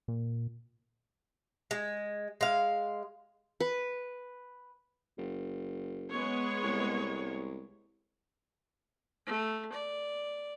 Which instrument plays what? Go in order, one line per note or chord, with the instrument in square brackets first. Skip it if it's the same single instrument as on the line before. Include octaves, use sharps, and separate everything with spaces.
[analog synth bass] A#2
[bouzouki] G#3
G#3 F5
[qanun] B4
[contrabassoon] F#1
[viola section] G#3 B3 C#5
[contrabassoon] C2
[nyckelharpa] A3
D5